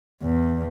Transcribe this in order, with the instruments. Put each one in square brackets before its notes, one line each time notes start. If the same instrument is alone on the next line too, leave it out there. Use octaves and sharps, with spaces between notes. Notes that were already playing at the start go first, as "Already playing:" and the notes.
[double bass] E2